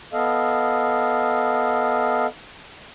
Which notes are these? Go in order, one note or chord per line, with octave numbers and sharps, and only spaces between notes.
B3 A4 D#5 F5